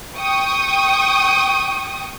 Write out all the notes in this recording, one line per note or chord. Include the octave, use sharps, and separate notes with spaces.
G5 C#6 D#6